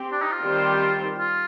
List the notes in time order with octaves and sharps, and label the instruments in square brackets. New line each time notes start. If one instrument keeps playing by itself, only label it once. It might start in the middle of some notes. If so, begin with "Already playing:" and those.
Already playing: [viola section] C4 G4
[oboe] D4
D#4
F4
[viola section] D#3 G3 C4 G4 C5
[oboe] F4